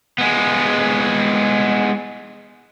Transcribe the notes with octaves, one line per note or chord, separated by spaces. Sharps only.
G#3 B3